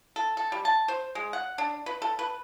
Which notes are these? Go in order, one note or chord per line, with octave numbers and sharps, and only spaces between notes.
A4
A4
G3
A5
C5
G#3
F#5
D4
B4
A4
B4